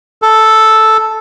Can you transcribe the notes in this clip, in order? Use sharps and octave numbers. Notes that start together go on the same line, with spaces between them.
A4